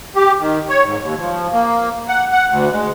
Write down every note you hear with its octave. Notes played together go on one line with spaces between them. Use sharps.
G4
D#3
C#5
G#2
D#2
F3
A#3
F#5
F#5
D2
G#3